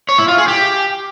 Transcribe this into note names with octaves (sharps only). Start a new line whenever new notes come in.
C#5
E4
F4
G#4
G4